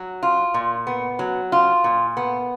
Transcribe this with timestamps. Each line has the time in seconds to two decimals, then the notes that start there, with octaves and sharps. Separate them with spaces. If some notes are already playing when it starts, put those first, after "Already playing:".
Already playing: F#3
0.23 F4
0.54 A#2
0.87 B3
1.19 F#3
1.52 F4
1.84 A#2
2.17 B3